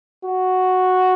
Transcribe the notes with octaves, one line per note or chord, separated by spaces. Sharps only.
F#4